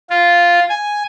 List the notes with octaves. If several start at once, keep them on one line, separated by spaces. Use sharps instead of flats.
F4
G#5